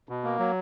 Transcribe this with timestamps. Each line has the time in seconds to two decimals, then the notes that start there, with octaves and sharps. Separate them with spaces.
0.09 B2
0.24 A#3
0.39 F#3